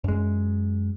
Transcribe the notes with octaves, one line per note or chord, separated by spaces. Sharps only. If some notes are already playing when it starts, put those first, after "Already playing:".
F#2 G#3